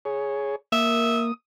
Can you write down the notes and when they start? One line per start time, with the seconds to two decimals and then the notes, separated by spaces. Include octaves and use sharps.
0.05 G#4 C#5
0.72 A#3 E5 D#6